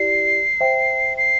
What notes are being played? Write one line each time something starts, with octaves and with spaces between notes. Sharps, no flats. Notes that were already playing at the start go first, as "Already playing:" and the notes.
Already playing: E4 G4 D5 C7
C5 E5 G5
C7